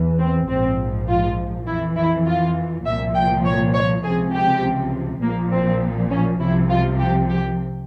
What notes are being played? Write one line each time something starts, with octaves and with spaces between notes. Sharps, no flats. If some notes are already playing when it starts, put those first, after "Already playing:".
Already playing: E2 E3
C4
A#1 G#2 F3 C4
F4
F2 E3 E4
E4
F4
C2 A#2 F3 E5
G5
C#5
C#5
C#2 C3 F3 G#4
G4
A#1 A#2 F3 A#3
C4
C#4
C2 C3 F3 E4
F4
G4
G4